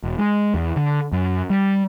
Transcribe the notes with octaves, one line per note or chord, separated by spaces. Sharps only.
E1
G#3
E2
D3
F#2
G3